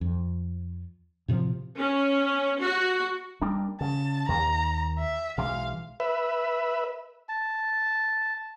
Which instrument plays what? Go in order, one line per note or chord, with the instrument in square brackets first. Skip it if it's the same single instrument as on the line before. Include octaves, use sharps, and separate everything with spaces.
[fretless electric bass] F2
A2 C3 D#3 F3
[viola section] C#4
F#4
[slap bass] G3 A#3 D4
[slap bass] C#3 [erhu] A5
[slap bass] D#2 [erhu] A#5
[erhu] E5
[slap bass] B1 E3 G#3 [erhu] F5
[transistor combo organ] B4 E5
[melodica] A5